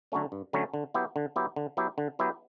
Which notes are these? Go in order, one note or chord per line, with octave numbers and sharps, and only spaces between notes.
D3 F#3 A3 C#4
G2
D3 F#3 A3 C#4
D3
F#3 B3 E4 G4
D3
F#3 B3 E4 G4
D3
F#3 B3 E4 G4
D3
F#3 B3 E4 G4